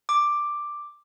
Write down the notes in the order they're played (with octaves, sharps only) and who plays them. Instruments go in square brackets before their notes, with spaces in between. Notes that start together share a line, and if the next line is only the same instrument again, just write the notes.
[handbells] D6